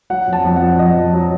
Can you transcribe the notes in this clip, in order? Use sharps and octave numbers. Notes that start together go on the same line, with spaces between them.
F#3 F#5
F2
A5
F2
F#5
F2
F2 D#5
F2
F#3